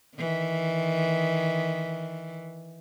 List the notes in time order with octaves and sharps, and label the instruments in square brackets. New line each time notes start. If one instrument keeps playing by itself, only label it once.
[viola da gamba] D#3 E3